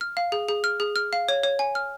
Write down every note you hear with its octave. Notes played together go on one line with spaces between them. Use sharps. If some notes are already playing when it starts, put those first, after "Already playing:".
F6
F5
G#4
G#4
F6
G#4
F6
F5
C#5
C#5
G#5
F6